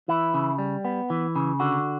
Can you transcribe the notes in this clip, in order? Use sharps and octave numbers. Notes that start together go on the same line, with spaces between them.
E3 E4
C#3
G3
B3
E3
C#3
D3 F#4